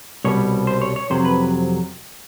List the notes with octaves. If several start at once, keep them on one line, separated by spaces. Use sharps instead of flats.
C2 B2 G3 C#5
C5
C#5
C#5
F2 C3 F#3 C5
B4